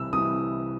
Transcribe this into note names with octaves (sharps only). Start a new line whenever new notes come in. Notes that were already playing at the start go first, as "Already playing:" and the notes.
Already playing: C2 C3 E3 E6
C2 C3 E3 D#6